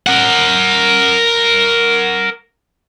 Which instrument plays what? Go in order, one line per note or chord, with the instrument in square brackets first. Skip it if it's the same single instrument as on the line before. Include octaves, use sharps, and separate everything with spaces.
[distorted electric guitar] A#4 F#5